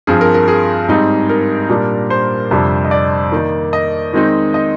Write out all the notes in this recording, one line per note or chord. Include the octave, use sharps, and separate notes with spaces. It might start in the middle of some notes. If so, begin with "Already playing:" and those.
G2 F3 C4 G#4
A#4
A#4
G#4
G#2 G3 C4 D#4
A#4
A#2 G3 D4
C5
F2 C3 G3 D4
D#5
D5
D#3 A#3 D#4
D#5
D#3 G#3 C4 D#4
D#5